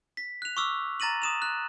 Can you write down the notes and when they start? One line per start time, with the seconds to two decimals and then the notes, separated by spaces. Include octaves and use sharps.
0.17 B6
0.42 F#6 F7
0.57 C#6 D6 E6 F6
1.00 A#5 A6 A#6 D#7 F#7
1.22 D#6 E7 F7
1.42 F#6